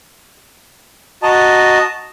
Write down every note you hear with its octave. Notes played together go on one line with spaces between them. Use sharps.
F#4 D#5 A5 A#5